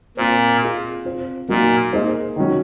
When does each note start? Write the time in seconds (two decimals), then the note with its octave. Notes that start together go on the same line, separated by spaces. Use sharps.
0.17 A#2 C4 F4 C5
0.62 C4 F4 G#4 D#5
1.05 C4 F4 C5
1.49 A#2 F#3 A#3 D#4 F#4
1.93 A#3 D#4 G#4 C5 D#5
2.36 D#3 F#3 C#4